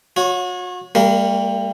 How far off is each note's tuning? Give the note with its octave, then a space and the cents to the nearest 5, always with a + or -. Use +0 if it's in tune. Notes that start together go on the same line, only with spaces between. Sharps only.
F#4 -40 C#5 +0
G3 +20 A#3 -35 A#4 +0